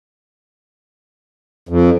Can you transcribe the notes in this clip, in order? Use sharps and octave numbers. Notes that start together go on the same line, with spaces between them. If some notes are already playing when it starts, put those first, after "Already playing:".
F2